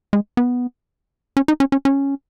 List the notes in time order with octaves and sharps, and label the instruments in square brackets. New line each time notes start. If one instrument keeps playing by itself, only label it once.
[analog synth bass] G#3
B3
C#4
D#4
C#4
C#4
C#4